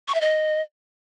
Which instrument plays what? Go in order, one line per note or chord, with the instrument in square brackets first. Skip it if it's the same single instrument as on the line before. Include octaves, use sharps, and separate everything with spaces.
[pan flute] C#6
E5
D#5